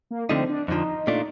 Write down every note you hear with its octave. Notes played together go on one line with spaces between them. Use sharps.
A#3
D3 F3 A3 C4 D#4
D4
F2 D3 F3 D#4
A#2 A3 D4 F4